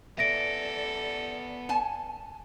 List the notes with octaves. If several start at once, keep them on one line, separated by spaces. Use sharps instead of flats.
B3 A4 D5 E5 A#6 D7
G#5 A5